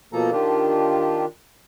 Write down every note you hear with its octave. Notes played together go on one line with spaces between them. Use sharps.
B2 F3 A#3 A4 A#5
D#3 D4 F4 G4